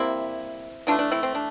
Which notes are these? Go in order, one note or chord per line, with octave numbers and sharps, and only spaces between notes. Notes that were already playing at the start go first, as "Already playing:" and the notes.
Already playing: C3 G3 A#3 C4 E4
E3 A3 D4 F4
D4
C4 E4
C4
D4